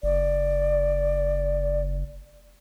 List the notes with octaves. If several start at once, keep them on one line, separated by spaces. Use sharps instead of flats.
F#1 D5